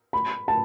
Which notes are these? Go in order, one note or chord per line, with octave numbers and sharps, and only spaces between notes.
B5
A5